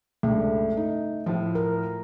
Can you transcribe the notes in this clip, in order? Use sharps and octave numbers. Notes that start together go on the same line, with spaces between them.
C#2 G2 A3
D#4
A2 F3
A#4